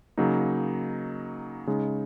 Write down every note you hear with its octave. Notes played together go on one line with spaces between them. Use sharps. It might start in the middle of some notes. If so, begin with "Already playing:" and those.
C#3 F#3 A#3 D#4
C#3 G#3 D#4